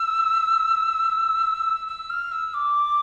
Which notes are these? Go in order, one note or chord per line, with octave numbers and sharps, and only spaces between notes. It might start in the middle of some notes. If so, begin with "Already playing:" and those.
Already playing: E6
E6
F6
E6
D6